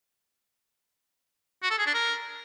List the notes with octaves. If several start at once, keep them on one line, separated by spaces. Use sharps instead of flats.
F#4
A4
G#4
D4
A#4